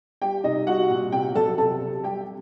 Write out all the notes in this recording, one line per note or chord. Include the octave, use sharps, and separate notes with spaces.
G3 G4 G5
C3 D#4 D#5
G3 F#4 F#5
A#2
C3 G4 G5
F#3 A4 A5
C3 A4 A5
C3
G3 G4 G5